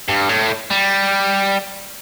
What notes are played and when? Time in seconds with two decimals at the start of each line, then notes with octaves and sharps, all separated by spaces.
0.08 G2
0.29 A2
0.70 G3